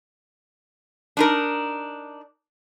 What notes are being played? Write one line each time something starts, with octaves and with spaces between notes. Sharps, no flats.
D4 D#4 A#4